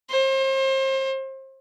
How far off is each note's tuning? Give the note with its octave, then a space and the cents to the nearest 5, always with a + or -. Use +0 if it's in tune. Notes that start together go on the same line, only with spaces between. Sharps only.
C5 +35